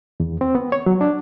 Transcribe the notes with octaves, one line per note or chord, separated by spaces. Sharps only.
E2
C4
B3
C#5
F#3
D4